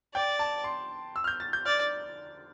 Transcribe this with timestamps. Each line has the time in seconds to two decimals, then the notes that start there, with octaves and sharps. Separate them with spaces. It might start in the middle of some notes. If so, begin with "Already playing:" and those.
0.14 D5 G5
0.39 A5
0.64 C6
1.16 E6
1.24 F6
1.27 G6
1.40 A6
1.53 G6
1.65 D5 F6